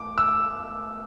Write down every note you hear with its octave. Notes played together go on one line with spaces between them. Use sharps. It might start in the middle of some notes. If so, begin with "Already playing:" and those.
Already playing: D6
E6